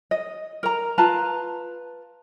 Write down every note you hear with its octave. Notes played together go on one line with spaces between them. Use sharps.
D#5
A#4 A#5
F4 B4 A5 A#5